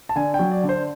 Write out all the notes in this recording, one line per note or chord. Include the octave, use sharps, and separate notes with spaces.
A5
D3 G#5
G5
F#3
D5
D3
C5